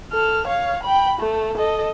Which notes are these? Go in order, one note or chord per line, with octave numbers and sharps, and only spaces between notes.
A4 F6
C#5 F5
G5 B5
A3
A4 D#5